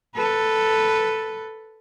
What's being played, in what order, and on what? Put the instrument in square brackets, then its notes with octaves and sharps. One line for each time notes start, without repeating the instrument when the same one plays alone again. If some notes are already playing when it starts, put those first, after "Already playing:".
[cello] A4 B4